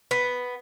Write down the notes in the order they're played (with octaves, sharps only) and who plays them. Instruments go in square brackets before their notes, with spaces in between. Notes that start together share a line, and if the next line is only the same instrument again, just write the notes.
[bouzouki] B3